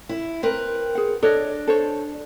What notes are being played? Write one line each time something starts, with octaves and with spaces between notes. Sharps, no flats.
E4
C4 A#4 B4
G#4 F#5
D4 A4 C#5 D#5
A4 C5 C#5